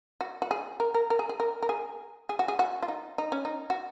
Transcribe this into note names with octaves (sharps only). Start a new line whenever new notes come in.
F#4
F#4
G#4
A#4
A#4
A#4
G#4
G#4
A#4
A#4
G#4
G#4
F#4
G#4
F#4
F4
D#4
D#4
C#4
D#4
F#4